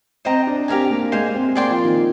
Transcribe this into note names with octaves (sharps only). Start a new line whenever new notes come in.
C4 C5 D#5 G5 A#5
D4
C4 G4 A#4 F5 G#5
A#3
G#3 C5 F5 G#5
C4
A#3 G#4 D5 G5 C6
F3
D#3